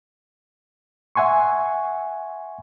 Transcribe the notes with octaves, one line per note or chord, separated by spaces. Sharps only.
E5 F#5 G#5 C6 C#6